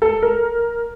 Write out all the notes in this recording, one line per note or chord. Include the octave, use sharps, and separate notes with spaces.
A4
A#4